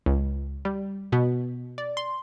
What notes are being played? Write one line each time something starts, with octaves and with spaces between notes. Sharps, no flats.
C#2
G3
B2
D5
C6